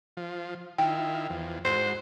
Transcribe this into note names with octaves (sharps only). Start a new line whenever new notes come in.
F3
D#3 E4 F4 G5
E2 F3
G#2 F#4 C5